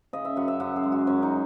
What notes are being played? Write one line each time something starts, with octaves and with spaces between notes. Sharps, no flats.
C#3 D#5
E5
F#2 F#5
E5
F#2 F#5
G#4
G#3
F#4
F#2 C#4
D#4